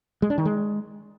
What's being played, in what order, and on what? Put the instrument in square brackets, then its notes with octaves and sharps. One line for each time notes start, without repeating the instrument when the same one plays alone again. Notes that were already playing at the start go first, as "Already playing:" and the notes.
[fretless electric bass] G#3
D4
D#3
G#3